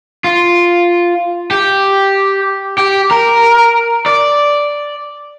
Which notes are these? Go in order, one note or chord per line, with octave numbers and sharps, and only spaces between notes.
F4
G4
G4
A#4
D5